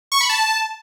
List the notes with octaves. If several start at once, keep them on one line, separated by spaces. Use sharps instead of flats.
C#6
B5
A5